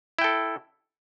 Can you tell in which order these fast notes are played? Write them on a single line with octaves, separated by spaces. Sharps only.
E4 G5 A4